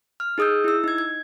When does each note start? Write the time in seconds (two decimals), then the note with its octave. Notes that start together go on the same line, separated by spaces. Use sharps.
0.20 F6
0.38 D#4 G#4 D#6 E6 G6
0.64 E4 E6
0.84 D#4 G#6
0.98 G#6